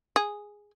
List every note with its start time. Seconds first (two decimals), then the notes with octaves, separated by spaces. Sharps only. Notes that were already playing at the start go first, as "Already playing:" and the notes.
0.16 G#4